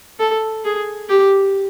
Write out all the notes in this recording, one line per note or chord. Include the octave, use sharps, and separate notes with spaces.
A4
G#4
G4